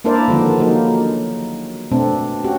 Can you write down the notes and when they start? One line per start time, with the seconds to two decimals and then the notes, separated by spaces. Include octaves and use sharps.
0.04 A#3 D4 E4 A#4 C5 D5
0.28 D3 D#3 F3 G#3 B3
0.60 F#3 A#3 D#4
1.91 B2 A3 C4 D4
2.44 C#4 F#4 G4